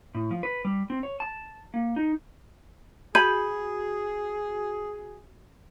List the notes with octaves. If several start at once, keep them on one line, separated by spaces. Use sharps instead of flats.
A2
F3
B4
G3
C4
C#5
A5
A#3
D#4
F#4 G#4 B5 G6 G#6 D#7